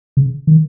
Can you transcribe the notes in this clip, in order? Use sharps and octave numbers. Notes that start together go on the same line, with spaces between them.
C#3
D#3